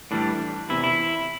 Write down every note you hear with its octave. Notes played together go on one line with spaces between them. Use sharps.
A2 E3 G3 D4
E2 C3 E3 E4
E4